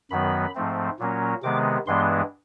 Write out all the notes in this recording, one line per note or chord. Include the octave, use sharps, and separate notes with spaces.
F#2 D#3 F#3 B3 B5
G#2 F3 A3 C4
A#2 F#3 A#3 C#4
C3 D#3 G#3 B3 D6
G2 E3 G#3 B3 D4 C6